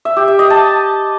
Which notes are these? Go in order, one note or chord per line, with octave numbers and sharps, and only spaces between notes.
E5
G4
E5
D#5
A5